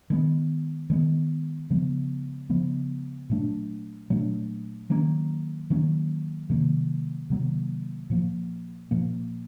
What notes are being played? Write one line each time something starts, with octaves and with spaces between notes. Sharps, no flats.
D#3 G#3 B3
D#3 G#3 B3
C#3 F3 G#3 B3
C#3 F3 G#3 B3
A#2 F#3 A3 D4
A#2 F#3 A3 D4
D#3 F#3 A#3 C#4
D#3 F#3 A#3 C#4
C3 D#3 F#3 A#3
C3 D#3 F#3 A#3
A#2 F3 A#3
A#2 F3 A#3